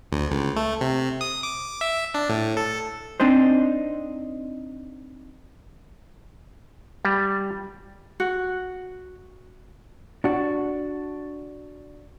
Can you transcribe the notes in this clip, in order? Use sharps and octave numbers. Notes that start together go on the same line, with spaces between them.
D2
C#2
A3
C3
D#6
D6
E5
D4
A2
A4
C4 D4 D#4 C5
G3
F#4
D4 F#4